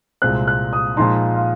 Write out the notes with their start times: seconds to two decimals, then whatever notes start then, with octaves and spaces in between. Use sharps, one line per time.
0.22 C2 A#2 G#3 C4 F#6
0.47 F#6
0.73 D#6
0.97 A#2 F3 G#3 D#4 C6
1.35 F5